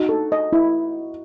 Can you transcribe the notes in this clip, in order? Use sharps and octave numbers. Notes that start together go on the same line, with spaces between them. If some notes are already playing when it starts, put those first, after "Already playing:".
Already playing: D#4 F#4
A4
D#5
E4